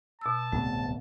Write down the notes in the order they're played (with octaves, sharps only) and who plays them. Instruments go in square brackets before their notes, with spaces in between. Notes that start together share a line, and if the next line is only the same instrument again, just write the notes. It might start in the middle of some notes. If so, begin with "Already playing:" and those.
[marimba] B2 E6 [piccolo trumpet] A5
[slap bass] D1 C2 B3 [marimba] A3